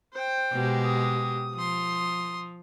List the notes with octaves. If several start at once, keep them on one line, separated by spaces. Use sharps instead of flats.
C5 G5
B2 G#3 G4
D#6
F3 C6 D#6